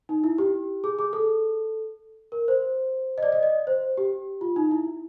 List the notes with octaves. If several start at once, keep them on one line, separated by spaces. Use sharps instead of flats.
D#4
E4
G4
G#4
G#4
A4
A#4
C5
D#5
D5
D#5
D#5
C5
G4
F4
D#4
E4